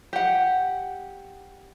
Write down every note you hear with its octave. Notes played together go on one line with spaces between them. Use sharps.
G4 F#5